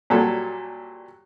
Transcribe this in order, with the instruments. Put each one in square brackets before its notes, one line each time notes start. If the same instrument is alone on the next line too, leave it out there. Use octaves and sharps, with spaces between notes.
[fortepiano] A#2 F#3 G3 A4